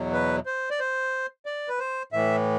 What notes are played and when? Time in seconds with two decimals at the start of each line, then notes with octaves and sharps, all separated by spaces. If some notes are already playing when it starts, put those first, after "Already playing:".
Already playing: E2 B2 F#3
0.13 B4
0.46 C5
0.71 D5
0.80 C5
1.46 D5
1.69 B4
1.79 C5
2.12 A2 E3 E5